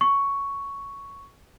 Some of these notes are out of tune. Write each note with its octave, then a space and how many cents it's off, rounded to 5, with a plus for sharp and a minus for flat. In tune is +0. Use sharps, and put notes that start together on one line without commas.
C#6 +5